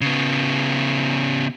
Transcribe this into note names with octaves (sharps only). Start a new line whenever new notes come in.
C#3 B3